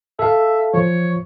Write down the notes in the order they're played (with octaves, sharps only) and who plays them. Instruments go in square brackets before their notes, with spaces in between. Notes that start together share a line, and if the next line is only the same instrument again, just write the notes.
[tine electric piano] A4 F5 [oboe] E5
[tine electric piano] F3 [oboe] C#5